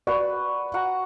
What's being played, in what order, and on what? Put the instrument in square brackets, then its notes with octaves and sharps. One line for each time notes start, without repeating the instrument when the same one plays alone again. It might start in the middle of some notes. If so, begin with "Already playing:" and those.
[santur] F#4 B4 [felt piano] D5
[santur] F#4 F#5 A#5